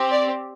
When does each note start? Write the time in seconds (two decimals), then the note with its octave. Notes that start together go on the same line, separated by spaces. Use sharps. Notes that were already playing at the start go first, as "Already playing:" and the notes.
Already playing: C4 G4
0.11 D5